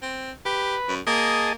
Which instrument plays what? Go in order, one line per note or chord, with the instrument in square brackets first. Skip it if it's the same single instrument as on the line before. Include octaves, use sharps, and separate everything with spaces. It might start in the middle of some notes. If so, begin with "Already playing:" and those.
[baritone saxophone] C4
[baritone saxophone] G4 [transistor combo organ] B4
[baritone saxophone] F#2
[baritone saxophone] A#3 [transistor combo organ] G#4 D#5 A5